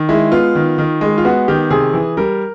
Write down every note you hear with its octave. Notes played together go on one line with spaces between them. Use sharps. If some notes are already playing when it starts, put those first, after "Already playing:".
Already playing: D#3
G#3 E4
B3 F4
D#3
D#3
G#3
F4
B3 F#4
D#3 G4
C3 G#4
E3
G3 A#4